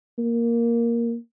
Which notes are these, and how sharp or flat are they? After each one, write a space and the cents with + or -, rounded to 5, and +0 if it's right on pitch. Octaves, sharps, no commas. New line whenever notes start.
A#3 +5